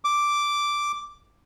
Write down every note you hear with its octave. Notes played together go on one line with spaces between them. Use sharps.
D6